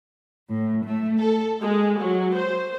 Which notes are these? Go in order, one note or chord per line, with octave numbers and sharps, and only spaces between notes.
A2
A3
A4
G#3
F#3
C5